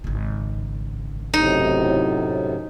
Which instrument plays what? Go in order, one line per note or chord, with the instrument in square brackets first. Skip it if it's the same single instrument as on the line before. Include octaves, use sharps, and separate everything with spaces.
[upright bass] G#1 C#3
[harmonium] F#2 A2 C3 [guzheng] D#4